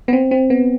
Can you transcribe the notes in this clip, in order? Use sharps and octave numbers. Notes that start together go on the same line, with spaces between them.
B3
C4
C4
B3